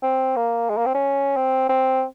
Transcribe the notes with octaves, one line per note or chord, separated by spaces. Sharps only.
C4
A#3
G#3
A#3
C4
C#4
C4
C4